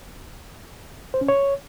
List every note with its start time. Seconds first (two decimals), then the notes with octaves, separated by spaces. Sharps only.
1.14 C5
1.21 C#4
1.28 C#5